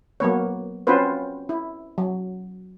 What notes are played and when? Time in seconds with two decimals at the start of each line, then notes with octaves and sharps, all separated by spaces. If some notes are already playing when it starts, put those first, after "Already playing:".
0.20 F#3 A#3 B3 C#5
0.87 C4 C#4 F4 F#4 B4 C5
1.49 E4
1.98 F#3